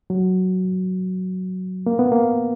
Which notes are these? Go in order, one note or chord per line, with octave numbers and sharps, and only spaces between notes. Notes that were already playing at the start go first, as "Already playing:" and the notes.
F#3
A#3
B3
A#3